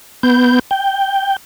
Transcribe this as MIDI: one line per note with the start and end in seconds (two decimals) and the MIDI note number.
0.23 0.59 59
0.23 0.59 91
0.71 1.36 79